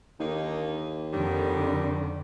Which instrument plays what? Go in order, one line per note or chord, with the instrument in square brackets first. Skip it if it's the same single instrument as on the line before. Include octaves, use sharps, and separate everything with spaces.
[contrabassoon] D#2 [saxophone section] D3 A#3 D#4
[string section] F2 D3 [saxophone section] D#3 G3